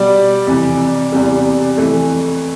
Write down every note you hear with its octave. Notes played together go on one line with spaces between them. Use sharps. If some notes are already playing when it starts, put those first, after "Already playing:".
Already playing: B2 G3 D5
F2 C3 E3
E2 C3 G3
F2 E3 A3